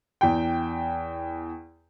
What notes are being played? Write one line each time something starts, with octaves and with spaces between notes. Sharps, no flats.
E2 G5